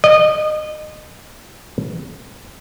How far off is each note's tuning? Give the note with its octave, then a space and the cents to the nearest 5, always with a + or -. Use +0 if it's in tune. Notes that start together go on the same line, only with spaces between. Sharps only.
D#5 -25